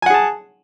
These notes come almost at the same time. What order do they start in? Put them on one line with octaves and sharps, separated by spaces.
G#5 F#5 G#4 A5